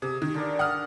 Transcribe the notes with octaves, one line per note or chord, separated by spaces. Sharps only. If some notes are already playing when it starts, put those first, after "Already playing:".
C3 G#4
D#3
D3 A#4 D5
F#5 D#6 F6